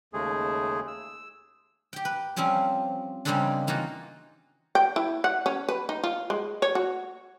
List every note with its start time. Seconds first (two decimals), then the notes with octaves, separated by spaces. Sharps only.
0.13 D#2 C#3 G#3 A3 G#4
0.88 E6
1.93 G4 G5
2.05 B4
2.36 F3 G3 C4 C#4 G4
3.25 C#3 G3 G#3 A#3 C4 D4
3.67 E3 A#3 D#4 F4 F#4
4.75 G5
4.96 E4
5.24 F#5
5.46 C#4
5.69 B4
5.89 D#4
6.04 F4
6.30 G#3
6.62 C#5
6.75 F#4